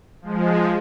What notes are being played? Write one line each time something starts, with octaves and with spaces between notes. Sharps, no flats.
F3 G#3